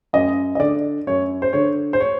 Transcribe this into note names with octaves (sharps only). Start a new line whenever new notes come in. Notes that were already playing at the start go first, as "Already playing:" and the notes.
F#2 D#5
D#5
D3 D5
F#2 C#5
C5
D3 C#5
C5
C#5